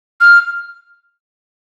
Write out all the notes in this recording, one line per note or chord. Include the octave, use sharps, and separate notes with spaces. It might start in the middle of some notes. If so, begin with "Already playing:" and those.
F6